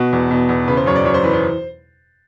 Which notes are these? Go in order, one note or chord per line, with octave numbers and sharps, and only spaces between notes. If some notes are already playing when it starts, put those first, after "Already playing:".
Already playing: B2 F#4
E2
B2
E2
C#3 B4
C5
F#2 C#5
D5
F#2 C#5
C5
E3 B4
C5